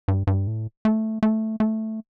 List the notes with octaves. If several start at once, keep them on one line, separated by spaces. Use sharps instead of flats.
G2
G2
A2
A3
A3
A3